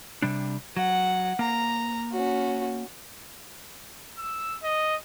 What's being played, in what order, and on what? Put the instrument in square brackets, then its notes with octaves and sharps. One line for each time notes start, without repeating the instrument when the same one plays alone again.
[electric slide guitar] C3 G3 D4
[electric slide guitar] F#3 [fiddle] F#5
[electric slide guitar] A#3 [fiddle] A#5
[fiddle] C#4 F#4
[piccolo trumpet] E6
D#5